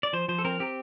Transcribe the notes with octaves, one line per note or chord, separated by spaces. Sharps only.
D5
F3 C5
F3 C5
A4
C4 A#4
C4 G4